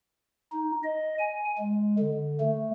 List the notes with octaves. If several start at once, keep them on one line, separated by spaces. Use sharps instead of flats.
D#4
D#5
G#5
G#3
D3
A3